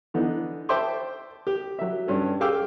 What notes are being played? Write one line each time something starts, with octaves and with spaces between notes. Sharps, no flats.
D3 E3 B3 D#4
C5 E5 G5 A5 C6 D6
G4
F#3 E5
G2 C#4 A4
G4 G#4 F5 G5 D6 E6